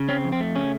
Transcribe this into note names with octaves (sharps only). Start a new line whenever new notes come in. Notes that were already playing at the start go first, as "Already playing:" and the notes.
Already playing: C#3
C4 C#4
F2
C4
A3
C#3 C#4